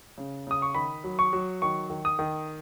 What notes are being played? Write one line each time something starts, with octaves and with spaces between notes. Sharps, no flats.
C#3
C#3 D#6
C#6
D#3 B5
F#3
C#6
F#3
D#3 C#6
D#3
D#6
D#3